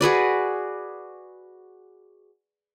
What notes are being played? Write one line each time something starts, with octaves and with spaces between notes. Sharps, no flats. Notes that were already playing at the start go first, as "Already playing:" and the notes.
F#4 G#4 B4 D5